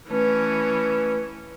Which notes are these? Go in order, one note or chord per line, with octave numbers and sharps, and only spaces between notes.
E3 A3 C#4 B4